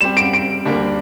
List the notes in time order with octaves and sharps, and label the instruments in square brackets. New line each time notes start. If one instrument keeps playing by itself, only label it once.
[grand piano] G3 C4 G4 [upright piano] E7
[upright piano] D7
D7
[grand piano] D2 D3 G3 A#3 D4